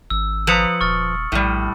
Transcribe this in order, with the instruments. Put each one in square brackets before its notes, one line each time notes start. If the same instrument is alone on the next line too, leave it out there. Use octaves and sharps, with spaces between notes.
[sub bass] G#1 [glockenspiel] E6
[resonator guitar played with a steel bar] F3 B4 A#5 [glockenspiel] D#6 C#7 F#7
[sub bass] D#1 [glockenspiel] C#6 F6 A6
[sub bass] A#1 [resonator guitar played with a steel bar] A2 G3